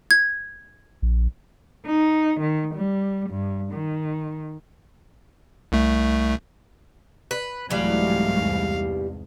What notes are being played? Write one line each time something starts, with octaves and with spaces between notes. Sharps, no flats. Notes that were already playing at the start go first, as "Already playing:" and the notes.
G#6
A#1
D#4
D#3
G3
G2
D#3
C2 A3
B4
C2 G#2 E3 F#3 G3 A3 F5
E2